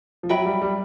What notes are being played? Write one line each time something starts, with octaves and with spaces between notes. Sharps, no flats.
F3
F#3 B4 E5 G5 B5
G3
G3